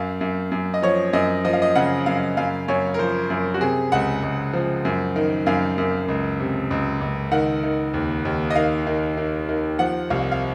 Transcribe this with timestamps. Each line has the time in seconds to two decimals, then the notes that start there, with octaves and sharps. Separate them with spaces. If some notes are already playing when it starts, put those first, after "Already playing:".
Already playing: F#2 F5
0.21 F#2
0.51 F#2
0.74 D#5
0.82 F3 C#5
1.13 F#2 D#5
1.45 F3 D#5
1.53 F5
1.62 D#5
1.75 C#3 F#5
2.06 F#2 F5
2.37 F#2 F5
2.68 F#2 C#5
2.94 A#4
2.99 F3 C5
3.30 F#2
3.54 F#4
3.61 C3 G#4
3.92 C#2 F#5
4.23 C#2
4.53 F3
4.85 F#2
5.16 D#3
5.46 F#2 F5
5.78 F#2
6.08 C#2
6.40 C3
6.71 C#2
7.01 C#2
7.32 D#3 F#5
7.63 D#3
7.94 D#2
8.25 D#2
8.50 D#5
8.55 D#3 F5
8.87 D#3
9.17 D#3
9.49 D#3
9.79 F3 F#5
10.10 C2 F5
10.31 F5